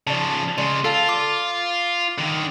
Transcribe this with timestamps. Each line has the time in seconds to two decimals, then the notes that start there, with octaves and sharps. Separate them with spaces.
0.07 C#3 F3 D5 A5
0.58 C#3 G#3 D5 C6
0.84 F4 A4 F5 A5
1.09 D6
2.18 D3 D#3